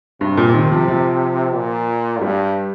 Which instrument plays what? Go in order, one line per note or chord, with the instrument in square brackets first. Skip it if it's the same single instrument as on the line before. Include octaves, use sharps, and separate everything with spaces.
[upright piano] G2 [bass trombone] C3
[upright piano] A#2
D#3
F3
F3
[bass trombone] A#2
[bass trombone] G2 [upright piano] G3